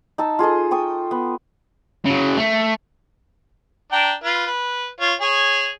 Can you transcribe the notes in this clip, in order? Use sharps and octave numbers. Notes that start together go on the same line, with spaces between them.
D#4 A5 E6
F4 G#4 A4 D#5
G5 C#6 D#6
B3
C#3 F#3
A3
D4 G5 A#5
F4 B4
B4
F4 C#5
G#4 C#5 G#5